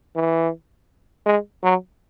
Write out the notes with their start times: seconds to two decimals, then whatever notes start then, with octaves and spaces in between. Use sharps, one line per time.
0.16 E3
1.26 G#3
1.63 F#3